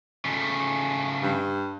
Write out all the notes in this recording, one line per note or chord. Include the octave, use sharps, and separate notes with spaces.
C#3 A3
G2